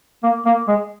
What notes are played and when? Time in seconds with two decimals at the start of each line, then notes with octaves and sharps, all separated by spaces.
0.23 A#3
0.46 A#3
0.68 G#3